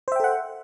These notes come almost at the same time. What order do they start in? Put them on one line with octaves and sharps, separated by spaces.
C5 E5 G5 A4 F#5